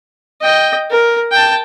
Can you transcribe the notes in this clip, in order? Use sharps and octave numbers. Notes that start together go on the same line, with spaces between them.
D#5 G5
A#4
G5 A5